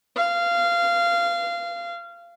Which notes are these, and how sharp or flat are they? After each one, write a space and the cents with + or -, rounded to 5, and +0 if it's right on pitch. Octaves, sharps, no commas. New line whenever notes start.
F5 -20